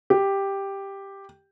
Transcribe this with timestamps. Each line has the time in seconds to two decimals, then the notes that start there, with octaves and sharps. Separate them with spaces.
0.10 G4